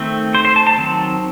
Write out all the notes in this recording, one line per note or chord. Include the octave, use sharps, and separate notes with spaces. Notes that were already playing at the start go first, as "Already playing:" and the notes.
Already playing: D#3 A3 C4
C5
C5
A5
A5
D#3 F#3 C4